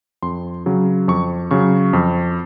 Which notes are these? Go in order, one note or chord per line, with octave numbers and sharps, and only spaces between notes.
F2 C6
C#3 F#3
F2 C#6
C#3 F#3 C#6
F2